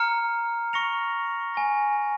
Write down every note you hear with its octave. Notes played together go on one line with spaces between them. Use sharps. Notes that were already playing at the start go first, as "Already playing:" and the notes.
Already playing: A#5 F6 C#7
C#6 A#6 C#7 F7
G#5 C#6 A#6